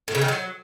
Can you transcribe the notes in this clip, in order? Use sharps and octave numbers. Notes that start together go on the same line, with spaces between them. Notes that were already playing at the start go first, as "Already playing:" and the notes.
A2
C#3
D#3
F#3